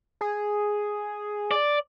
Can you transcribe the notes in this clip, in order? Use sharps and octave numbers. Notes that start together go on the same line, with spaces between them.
G#4
D5